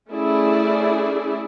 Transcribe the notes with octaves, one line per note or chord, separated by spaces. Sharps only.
A3 C#4 E4 G#4 D5